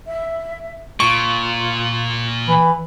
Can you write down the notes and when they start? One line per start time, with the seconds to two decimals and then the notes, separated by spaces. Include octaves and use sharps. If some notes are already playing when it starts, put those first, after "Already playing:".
0.06 E5
1.00 A#2 F4 C#6
2.47 E3 B5